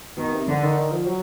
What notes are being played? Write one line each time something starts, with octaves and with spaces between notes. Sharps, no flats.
B2 D#3
C3
D3
D#3
D#3
F3
F#3